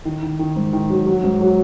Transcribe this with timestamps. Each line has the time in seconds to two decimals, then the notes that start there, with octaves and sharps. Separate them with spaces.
0.05 D#3
0.23 D#3
0.39 D#3
0.56 G#2
0.73 D#3
0.90 F#3
1.06 F#3
1.24 G#2
1.41 F#3